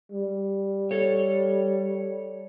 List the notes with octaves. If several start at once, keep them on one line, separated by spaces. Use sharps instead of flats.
G3
A4 C#5